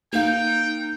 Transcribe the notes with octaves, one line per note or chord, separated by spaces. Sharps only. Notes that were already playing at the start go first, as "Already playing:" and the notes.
A#3 D#4 F5 G5